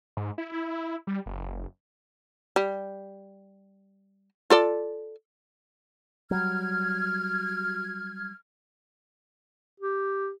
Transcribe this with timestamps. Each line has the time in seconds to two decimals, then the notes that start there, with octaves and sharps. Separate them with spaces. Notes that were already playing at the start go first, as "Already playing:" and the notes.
0.17 G#2
0.38 E4
0.52 E4
1.07 G3
1.26 F#1
2.56 G3
4.50 F4 A4 D5
6.31 F#3 G3 F6 G#6
9.80 G4